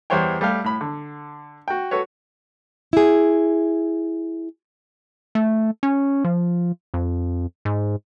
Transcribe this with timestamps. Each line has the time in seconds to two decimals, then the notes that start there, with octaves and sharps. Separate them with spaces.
0.10 E2 G3 C5 C#5 G5
0.41 G3 A3 G4 F5
0.64 A2 B5
0.81 D3
1.68 F#4 G5
1.91 F#4 A4 B4 C#5
2.93 E4 G#4
5.35 A3
5.83 C#4
6.25 F3
6.94 F2
7.65 G#2